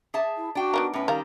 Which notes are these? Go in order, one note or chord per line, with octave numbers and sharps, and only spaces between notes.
G#4 E5 A5
E4
D4 F#4 G5
B3 D#4 A#4
A2 C#4 B4
D#3 G3 A#4 F5